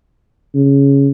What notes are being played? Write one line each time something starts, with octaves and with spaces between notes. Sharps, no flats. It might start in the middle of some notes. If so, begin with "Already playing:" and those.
C#3